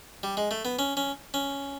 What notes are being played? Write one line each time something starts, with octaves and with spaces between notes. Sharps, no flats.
G3
G#3
A3
B3
C#4
C#4
C#4